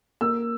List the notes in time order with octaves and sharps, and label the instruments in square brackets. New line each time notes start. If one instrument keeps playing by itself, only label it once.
[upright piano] A#3 E6